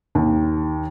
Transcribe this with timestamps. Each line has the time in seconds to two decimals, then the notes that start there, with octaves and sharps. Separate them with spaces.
0.15 D#2